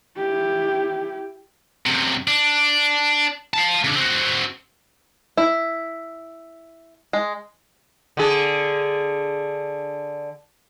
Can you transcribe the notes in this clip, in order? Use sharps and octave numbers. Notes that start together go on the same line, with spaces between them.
E4 G4
F#2 C3
D4
F5 A5
C#3 D4
C4 F#4
E4
G#3
D3 G#4